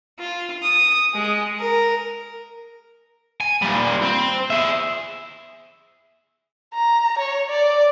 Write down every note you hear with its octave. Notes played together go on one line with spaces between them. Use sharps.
F4
D#6
G#3
A#4
G#5
A#2 G3
C4
G#4 E5
A#5
C#5
D5